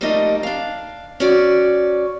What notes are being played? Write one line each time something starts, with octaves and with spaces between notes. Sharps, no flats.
F3 G3 A3 A#3 D#4 D#5
D4 F5
C#4 F#4 D5